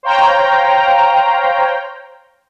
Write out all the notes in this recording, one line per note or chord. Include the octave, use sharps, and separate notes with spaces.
C5 C#5 F5 G5 A#5